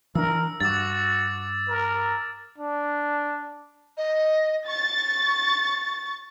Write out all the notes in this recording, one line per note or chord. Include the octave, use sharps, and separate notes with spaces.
E3 D4 A#4 E6
G2 F#4 D6 E6 A6
A#4
D4
D#5
C#6 A6